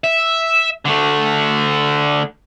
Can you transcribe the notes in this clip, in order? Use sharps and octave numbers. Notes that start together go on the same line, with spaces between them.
E5
D3 A3